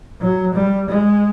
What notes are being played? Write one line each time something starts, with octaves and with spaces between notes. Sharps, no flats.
F#3
G3
G#3